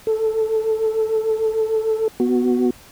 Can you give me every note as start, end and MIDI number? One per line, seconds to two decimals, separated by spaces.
0.07 2.08 69
2.20 2.70 59
2.20 2.70 66